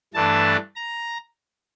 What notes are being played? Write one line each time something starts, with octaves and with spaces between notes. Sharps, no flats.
G2 E3 A3 D4 A5
A#5